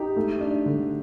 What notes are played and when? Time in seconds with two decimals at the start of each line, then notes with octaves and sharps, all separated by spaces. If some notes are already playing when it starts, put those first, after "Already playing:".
Already playing: D#4 G4
0.16 A3
0.41 D4
0.66 D3